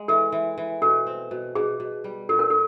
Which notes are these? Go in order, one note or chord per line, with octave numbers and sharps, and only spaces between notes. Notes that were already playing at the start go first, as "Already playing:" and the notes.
Already playing: G#3
E3 A4
E3
E3
B2 A4
C4
B2
B2 G#4
B2
G3
A#2 A4
A#4
A4